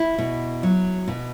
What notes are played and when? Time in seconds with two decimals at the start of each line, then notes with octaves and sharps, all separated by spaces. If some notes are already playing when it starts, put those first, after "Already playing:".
Already playing: E4
0.18 B2
0.63 F#3
1.08 B2